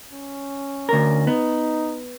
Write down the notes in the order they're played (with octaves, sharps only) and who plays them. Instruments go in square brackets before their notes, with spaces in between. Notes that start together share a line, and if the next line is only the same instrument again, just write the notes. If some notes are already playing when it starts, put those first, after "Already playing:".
[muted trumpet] C#4
[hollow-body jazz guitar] D2 A#4
[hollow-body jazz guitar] B3 [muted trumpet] D#4